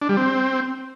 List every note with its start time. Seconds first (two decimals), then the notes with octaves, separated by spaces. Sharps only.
0.02 D4
0.09 G3
0.17 C4